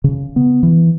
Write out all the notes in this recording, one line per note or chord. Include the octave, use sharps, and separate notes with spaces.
C#3
B3
E3